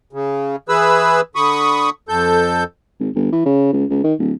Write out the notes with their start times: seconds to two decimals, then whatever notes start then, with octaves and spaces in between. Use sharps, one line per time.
0.13 C#3
0.69 E3 G#4 B4 B5 E6
1.35 D3 B5 C#6 D#6
2.09 F2 A4 G6
3.00 G#1
3.15 G1
3.33 E3
3.46 C#3
3.73 C#2
3.90 C#2
4.04 D#3
4.19 D1